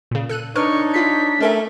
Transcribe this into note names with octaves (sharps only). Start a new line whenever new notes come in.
A#2 C#3
A4 F#6 D#7
D4 D#4 A#4 B4 C#5 C#6 F6
E4 F4 B6 C7
A3 C#4 A#4 E5